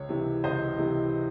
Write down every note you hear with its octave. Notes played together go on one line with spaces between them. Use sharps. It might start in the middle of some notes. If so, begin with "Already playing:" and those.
Already playing: C#2 C#5
C3 E3
C#2 C5 D#5
C3 E3